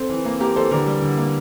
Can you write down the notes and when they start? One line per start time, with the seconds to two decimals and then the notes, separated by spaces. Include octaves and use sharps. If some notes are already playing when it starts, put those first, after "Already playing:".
Already playing: C4 A4 C5
0.10 E3
0.25 A#3
0.40 A#3 G4 A#4
0.56 E3 A4 C5
0.71 D3 G4 A#4
0.86 G3
1.02 D3
1.18 A#3